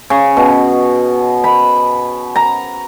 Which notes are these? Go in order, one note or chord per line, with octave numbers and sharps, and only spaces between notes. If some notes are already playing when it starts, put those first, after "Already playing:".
C#3
B2
B5
A#5